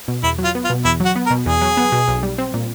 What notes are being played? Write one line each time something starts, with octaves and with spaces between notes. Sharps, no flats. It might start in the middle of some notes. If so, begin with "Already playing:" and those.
B2
E2 E4
F#3
F4
B3
F4
B2
E2 E4
F#3
F#4
B3
A#4
B2
E2 G#4
F#3
B3
B2
B1
G3
C4
A#2